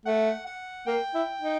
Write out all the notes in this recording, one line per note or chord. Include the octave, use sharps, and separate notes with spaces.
A3 F#5
F#5
A#3 G5
E4
D#4